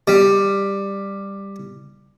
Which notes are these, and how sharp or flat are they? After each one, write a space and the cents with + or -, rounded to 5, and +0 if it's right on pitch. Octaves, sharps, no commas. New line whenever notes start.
G3 +10